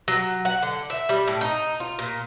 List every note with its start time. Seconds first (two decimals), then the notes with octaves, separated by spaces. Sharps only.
0.08 F#3
0.45 F#5
0.62 D3
0.90 E5
1.09 G3
1.27 A2
1.41 D#4
1.80 F4
1.99 A#2